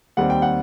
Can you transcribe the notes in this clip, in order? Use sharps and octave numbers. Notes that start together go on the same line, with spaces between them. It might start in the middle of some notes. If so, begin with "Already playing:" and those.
D#2 D#3 G3 C4 F#5
G5
F#5